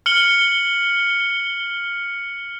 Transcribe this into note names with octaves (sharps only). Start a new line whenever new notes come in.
F6 C#7 F#7 G7